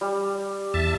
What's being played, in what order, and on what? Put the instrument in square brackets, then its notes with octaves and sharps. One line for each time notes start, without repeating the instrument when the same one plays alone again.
[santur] G3
[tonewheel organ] E2 E5 A5